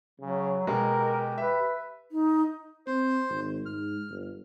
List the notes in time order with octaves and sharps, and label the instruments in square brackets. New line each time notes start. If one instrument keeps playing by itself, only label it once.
[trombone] C#3 [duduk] F#3
[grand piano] B2 G#3 [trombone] G4 [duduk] A#4
[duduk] B4 [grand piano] E5
[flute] D#4
[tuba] C4 [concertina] C5
[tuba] G#1
[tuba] G#2 [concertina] F6
[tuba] G1